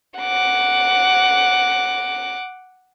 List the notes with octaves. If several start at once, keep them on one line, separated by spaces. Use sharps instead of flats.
F#5 D6